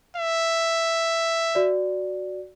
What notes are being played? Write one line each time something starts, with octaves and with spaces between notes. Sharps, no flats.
E5
F#4 D5